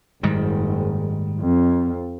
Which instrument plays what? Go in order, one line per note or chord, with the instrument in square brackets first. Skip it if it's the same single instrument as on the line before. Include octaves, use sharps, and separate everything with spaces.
[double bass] F#1 [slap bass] G#2 D#3 G3
[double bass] F2